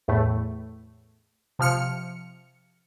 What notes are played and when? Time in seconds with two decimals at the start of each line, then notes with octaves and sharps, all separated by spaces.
0.08 E2 A2 A3
1.59 C3 F3 F6 C#7